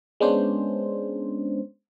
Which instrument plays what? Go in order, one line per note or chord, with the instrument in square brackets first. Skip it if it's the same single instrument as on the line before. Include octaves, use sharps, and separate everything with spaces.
[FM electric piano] G#3 B3 C#4 D4 C5